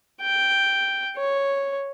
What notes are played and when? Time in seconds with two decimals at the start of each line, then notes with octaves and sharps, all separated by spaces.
0.22 G5
1.17 C#5